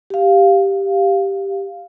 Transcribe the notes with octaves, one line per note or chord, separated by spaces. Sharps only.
G4 F5